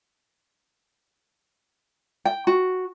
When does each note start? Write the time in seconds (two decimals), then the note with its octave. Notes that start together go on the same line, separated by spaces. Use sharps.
2.25 G5
2.47 F#4